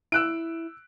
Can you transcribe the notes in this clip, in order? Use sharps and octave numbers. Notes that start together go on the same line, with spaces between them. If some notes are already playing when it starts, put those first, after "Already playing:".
E4 E6 F#6 D7